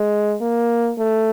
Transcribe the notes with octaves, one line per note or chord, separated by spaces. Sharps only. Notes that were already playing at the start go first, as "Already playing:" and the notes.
Already playing: G#3
A#3
A3